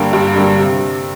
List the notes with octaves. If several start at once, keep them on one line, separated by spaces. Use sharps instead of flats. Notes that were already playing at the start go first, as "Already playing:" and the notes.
Already playing: G2 D3 G3 A#3
G2
D3 G3 A#3
C3